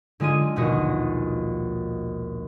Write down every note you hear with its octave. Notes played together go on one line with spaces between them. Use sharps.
D3 G#3 F4 G#4 D#7
A#1 D#2 B2 F#4 D#5